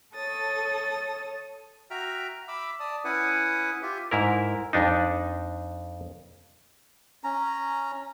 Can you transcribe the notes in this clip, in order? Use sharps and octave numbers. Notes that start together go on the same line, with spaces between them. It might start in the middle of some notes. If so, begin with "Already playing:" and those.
A4 C#5 D#6 A6
F#4 E5 G5 A#5 F6
E5 B5 D6 E6
D5 A5 D#6
C#4 E4 B4 F#5 G#5 D#6
F4 G4 E5
G#2 E4 A#4
F2 D4 D#4
C#4 A#5